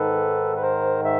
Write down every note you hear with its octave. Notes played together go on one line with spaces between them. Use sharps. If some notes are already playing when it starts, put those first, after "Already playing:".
Already playing: G#2 D#3 A4 B4
B4
A#4 C5
E5